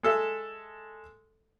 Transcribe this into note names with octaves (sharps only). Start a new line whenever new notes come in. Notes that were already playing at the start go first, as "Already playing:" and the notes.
G#3 A4 E5